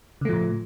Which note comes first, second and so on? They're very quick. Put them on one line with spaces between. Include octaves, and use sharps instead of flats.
C#3 A3 F3 A2